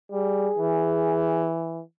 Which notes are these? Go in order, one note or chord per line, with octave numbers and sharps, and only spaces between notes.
G3 G#4
E3